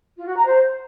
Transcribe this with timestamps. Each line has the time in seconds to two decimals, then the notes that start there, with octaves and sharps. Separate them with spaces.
0.18 F4
0.27 F#4
0.37 A#5
0.46 C5